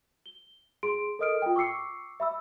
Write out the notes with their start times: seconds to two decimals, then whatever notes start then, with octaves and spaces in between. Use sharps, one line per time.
0.26 G7
0.83 G#4 C6 D7
1.19 A4 A#4 D#5 D#6 F6 D7
1.42 F4 G5
1.56 C#6 D6 E6 C7 C#7
2.20 E5 B5 E6